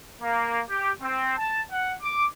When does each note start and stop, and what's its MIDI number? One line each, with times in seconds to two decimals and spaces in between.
0.22 0.61 58
0.70 0.91 67
1.02 1.35 60
1.38 1.61 81
1.72 1.94 78
2.02 2.27 86